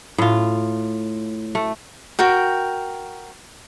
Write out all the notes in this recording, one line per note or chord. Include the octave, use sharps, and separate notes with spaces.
A2 F4
A3
F#4 A#4 G5